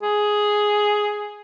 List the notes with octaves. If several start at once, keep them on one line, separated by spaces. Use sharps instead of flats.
G#4